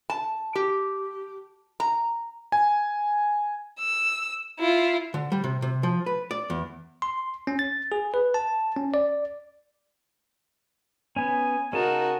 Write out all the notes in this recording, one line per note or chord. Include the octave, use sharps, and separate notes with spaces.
A5
G4
A#5
G#5
E6
E4 F4
D3
G3
C3
C3
F3
B4
D5
E2
C6
C#4
A6
G#4
B4
A5
C#4
D5
B3 C#4 G#5
C#3 C#4 D#4 F#4 A#4 A5